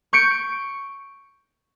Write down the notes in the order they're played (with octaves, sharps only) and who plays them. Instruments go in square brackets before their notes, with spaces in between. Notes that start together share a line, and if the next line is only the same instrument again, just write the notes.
[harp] C#6 G6 C#7 D7